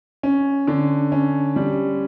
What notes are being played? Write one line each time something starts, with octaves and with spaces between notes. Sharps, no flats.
C#4
D3
C#4
G3